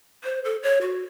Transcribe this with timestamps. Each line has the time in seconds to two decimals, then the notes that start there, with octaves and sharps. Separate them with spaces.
0.24 C5
0.45 A4
0.63 C#5
0.81 F#4